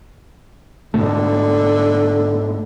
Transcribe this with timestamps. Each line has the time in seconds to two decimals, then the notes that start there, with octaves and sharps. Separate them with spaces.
0.94 G#2 B2 D3 A3